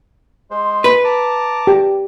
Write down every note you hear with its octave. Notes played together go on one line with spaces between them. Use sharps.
G#3 C5
B4
A5 A#5 D6
G4